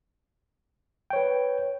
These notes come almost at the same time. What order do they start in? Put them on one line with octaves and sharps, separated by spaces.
G5 C#5 B4